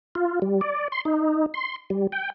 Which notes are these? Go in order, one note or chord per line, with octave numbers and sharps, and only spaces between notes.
F4
G3
D5
C6
D#4
C6
G3
G5